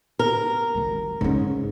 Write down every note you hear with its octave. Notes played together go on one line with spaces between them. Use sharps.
A#4
G#1 G3
G#2 C#4